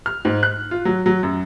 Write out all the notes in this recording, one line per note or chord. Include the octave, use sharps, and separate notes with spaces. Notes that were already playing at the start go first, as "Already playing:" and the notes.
F6
G#2
F#6
F4
F#3
F#3
F#2